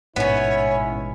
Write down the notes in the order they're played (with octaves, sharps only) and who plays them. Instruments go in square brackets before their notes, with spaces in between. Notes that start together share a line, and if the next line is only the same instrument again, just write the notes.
[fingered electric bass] A1 G#2 B2 [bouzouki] B3 C#4 [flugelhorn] E4 [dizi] C#5